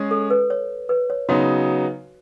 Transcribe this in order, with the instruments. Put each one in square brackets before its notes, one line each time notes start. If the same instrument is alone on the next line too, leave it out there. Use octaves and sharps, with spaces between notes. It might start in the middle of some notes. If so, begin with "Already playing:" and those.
Already playing: [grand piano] G#3 C#4 G#4
[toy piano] A4
B4
C#5
B4
C#5
[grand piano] C#3 F#3 B3 D#4 [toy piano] F#4